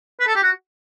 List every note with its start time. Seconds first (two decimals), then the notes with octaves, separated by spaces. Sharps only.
0.20 B4
0.27 A4
0.35 G4
0.43 F#4